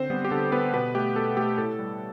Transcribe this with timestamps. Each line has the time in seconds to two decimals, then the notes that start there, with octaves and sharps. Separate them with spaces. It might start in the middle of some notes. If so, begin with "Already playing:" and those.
Already playing: D3 C4 C5
0.10 G3 B3 B4
0.25 G4
0.31 D3 A4
0.52 G3 B3 B4
0.73 B2 B3 B4
0.94 A3 G4
1.16 B2 A4
1.37 A3 G4
1.58 A2 A4
1.79 G3